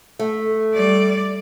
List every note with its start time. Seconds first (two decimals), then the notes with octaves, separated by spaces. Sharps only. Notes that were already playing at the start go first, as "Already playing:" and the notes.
0.19 A3
0.74 G3 D5